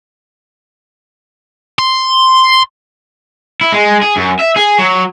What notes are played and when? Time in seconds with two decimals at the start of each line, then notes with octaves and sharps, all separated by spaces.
1.79 C6
3.61 E4
3.72 G#3
4.03 G#4
4.17 F#2
4.40 E5
4.57 G#4
4.79 F#3